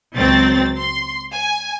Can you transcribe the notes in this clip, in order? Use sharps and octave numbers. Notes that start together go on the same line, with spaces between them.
C#2 F#3 C4 A6
C6
G#5